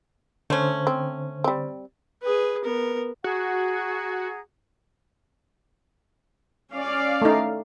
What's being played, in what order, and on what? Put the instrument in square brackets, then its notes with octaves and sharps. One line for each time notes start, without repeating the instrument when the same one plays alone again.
[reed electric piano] D3 C5 [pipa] A3 C#4
[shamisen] C4
G3 C4
[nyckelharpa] G#4 B4
B3 A#4
[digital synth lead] F#4 [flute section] G#4 F#5 A#5
[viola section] C#4 D5 F5
[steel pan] A3 D#4